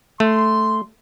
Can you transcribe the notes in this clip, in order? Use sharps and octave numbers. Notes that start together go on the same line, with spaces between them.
A3 C6